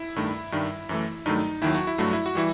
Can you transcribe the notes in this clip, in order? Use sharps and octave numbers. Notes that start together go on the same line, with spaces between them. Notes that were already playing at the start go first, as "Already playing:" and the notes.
Already playing: E4
G2 D#3 A3
G2 D#3 G3
F#2 E3 A3
G2 D#3 F#3 A3 D#4
D#2 D#3 F#3 E4
F#4
E4
G2 F#3 A3 F#4
E4
F#4
E3 G3 E4